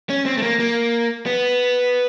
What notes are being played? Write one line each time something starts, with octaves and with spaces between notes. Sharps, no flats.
C#4
C4
A3
A#3
A#3
B3